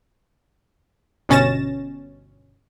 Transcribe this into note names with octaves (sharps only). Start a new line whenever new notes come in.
G1 B2 C#4 A6 A#6 E7